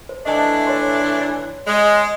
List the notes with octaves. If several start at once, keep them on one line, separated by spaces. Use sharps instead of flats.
C5
E3 A3 D4 D#5 A5
C#5 C6
G#3